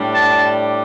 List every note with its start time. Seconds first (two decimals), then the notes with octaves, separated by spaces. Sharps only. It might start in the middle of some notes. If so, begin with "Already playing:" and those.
Already playing: A2 G3 D4
0.14 A5